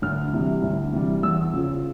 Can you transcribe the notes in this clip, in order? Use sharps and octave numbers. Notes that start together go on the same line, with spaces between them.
D2 F6
C3 E3 G3
D2
C3 E3 G3
E2 E6
C#3 F3